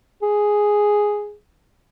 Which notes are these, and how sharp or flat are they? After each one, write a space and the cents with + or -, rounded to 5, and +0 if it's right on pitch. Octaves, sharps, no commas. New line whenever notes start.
G#4 +0